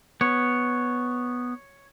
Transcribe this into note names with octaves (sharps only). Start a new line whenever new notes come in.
B3 C#5